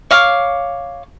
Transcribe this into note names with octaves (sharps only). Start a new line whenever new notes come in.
C#5 F5 D6